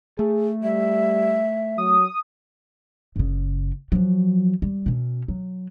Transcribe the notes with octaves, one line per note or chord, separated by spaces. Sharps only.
A3 G#4
G3 E5
F#3 D#6
F#1 C#3
F3 F#3
G3
B2 C#4
F#3